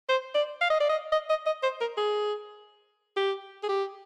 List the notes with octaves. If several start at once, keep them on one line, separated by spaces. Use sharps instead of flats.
C5
D5
F5
D#5
D5
D#5
D#5
D#5
D#5
C5
A#4
G#4
G4
G#4
G4